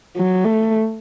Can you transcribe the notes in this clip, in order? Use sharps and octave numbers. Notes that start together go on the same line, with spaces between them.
F#3
A3